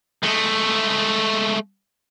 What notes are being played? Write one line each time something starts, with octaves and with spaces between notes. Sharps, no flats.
G#3 A3